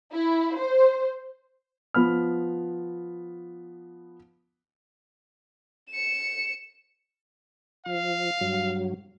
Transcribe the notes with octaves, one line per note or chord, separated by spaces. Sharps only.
E4
C5
F3 B3 B5 F6
C#7 E7
F3 F5
G2 F#3